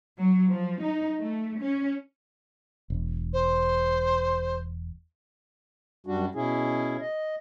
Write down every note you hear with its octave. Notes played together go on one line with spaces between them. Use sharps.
F#3
F3
D#4
A3
C#4
E1
C5
F#2 G3 D4 F#4
B2 C#4 E4 G#4
D#5